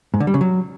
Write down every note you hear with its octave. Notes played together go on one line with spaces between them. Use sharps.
G#2
D3
G3
C#3
F#3